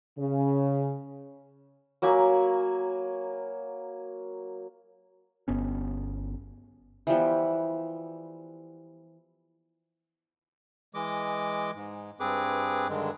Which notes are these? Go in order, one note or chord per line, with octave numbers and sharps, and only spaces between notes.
C#3
F#3 A#3 G#5 B5
G1 B3 C#4
E3 F3 G3 B3
E3 G#3 D#5 D6
G#2
G2 C4 G#4 B4 D6
G2 D3 D#3 G#3